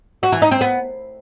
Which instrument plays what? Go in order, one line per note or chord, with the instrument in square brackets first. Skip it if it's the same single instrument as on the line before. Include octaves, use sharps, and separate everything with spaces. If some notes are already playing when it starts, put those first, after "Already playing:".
[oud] F#4
E3
D#4
C4
B3